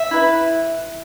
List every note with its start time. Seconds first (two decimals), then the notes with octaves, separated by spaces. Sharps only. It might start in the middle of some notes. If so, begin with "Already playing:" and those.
Already playing: E5
0.11 E4 B4